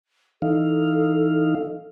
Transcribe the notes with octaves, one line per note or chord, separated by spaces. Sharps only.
E3 D#4 A4 F5